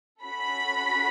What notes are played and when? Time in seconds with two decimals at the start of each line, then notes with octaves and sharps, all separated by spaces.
0.22 C#4 F#4 A4 B5